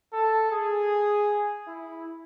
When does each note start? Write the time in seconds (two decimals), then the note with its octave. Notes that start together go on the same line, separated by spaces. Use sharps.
0.13 A4
0.52 G#4
1.68 E4